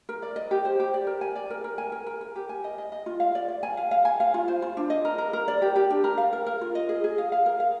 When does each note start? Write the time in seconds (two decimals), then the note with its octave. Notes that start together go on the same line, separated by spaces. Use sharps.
0.09 A#4
0.22 D5
0.36 D#5
0.51 G4
0.65 C5
0.80 G4
0.94 D5
1.07 A#4
1.21 G#5
1.35 D5
1.50 A#4
1.64 A#4
1.78 G#5
1.92 A#4
2.06 A#4
2.21 A#4
2.36 G4
2.49 G#5
2.64 D#5
2.78 D#5
2.92 D#5
3.06 F4
3.20 F5
3.35 D5
3.48 D5
3.63 G#5
3.77 F5
3.91 F5
4.05 G#5
4.20 F5
4.34 F4
4.48 C5
4.62 F4
4.77 D4
4.90 D#5
5.05 A#4
5.18 A#4
5.33 A#4
5.48 D5
5.62 G4
5.76 G4
5.90 D4
6.04 A#4
6.18 F5
6.33 A#4
6.46 A#4
6.61 F4
6.75 D#5
6.89 G#4
7.04 G#4
7.18 F5
7.32 F5
7.46 A#4
7.60 F5